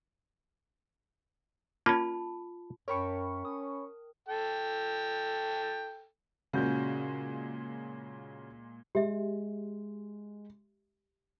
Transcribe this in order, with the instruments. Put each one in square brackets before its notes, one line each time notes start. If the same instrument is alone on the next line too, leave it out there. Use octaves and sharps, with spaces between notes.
[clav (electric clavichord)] A#3 C#4 [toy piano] F4 A5 B5
[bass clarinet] F#2 [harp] A#4 G5 A5 [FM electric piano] C#5 B5 C#6
[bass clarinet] C#4 [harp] D#6
[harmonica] A4 G5
[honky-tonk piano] A#2 G#3 [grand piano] C#3 F#4 G6
[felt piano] G#3 [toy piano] G4 E5